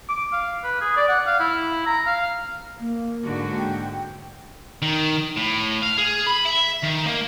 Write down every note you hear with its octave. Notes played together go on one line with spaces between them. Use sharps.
D6
F5
B4
G#4
D5
F#5
F5
E4
A#5
F5
A#3
G#2 D3 F#4
G5
D#3
A2
F5
G#4
B5
E5
D#3
A#3